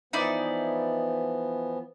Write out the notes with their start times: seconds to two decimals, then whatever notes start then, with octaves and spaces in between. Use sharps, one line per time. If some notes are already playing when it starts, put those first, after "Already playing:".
0.13 E3 F3 B3 D#4 E4 D5